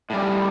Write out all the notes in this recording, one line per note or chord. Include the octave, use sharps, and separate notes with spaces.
A2 G3